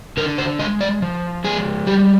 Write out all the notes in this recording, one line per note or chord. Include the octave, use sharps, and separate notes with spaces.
D3 A#4
C5
G#3 D#5
D5
F3
G#3 G#4
G3 G4